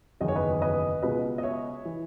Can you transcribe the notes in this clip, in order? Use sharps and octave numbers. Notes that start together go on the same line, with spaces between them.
F#1 E2 D#3 D#5
C#5
B4 D#5
B4 D#5
C#2 B2 B4 D#5
D#5
C#5 E5
E3